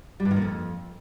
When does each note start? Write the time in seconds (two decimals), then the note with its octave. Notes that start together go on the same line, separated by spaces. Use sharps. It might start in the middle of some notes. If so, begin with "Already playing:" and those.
0.20 G3
0.25 G2
0.31 D#3
0.36 A#2
0.42 F2